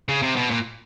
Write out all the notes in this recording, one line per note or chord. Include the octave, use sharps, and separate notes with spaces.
C#3
C3
B2
A#2